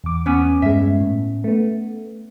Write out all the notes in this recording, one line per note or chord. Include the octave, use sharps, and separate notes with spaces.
E2 D6
B3 C#4 D#7
G2 G#3 E5
A2
A3 B3